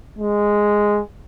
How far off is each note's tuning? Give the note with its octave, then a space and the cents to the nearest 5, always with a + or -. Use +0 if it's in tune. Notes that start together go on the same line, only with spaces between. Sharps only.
G#3 -5